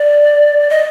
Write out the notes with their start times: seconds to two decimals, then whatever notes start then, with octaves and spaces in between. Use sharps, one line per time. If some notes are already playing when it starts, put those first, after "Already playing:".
Already playing: D5
0.70 D#5